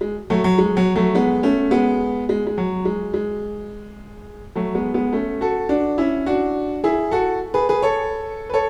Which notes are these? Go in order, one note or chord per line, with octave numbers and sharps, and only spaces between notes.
G#3
F#3 A3
F#3
G#3
F#3
F#3 A3
G#3 B3
A3 C#4
G#3 B3
G#3
G#3
F#3
G#3
G#3
F#3 A3
G#3 B3
G#3 B3
A3 C#4
F#4 A4
D4 F#4
C#4 E4
D4 F#4
E4 G#4
F#4 A4
G#4 B4
G#4 B4
A4 C#5
B4
A4 C#5